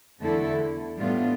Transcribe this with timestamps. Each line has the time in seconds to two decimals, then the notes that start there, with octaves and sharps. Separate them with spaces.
0.22 E2 D3 A3 E4 A4
0.98 A2 G3 B3 D4 F4